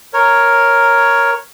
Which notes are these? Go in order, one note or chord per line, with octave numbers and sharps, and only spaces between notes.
A#4 C#5